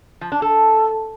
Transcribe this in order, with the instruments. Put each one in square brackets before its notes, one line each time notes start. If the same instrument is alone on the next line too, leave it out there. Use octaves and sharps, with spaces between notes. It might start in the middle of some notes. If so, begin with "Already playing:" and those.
[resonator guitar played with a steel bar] F3
D4
A4